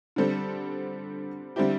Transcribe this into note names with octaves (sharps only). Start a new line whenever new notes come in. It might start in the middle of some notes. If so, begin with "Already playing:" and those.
D3 G3 C4 A4
D3 G3 C4 E4 G4